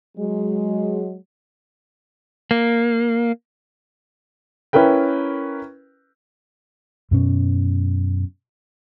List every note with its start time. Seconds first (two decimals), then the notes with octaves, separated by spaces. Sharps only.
0.17 F#3 G#3
2.51 A#3
4.73 C#4 E4 A#4 B4 G5
7.11 F#2 B2 C#4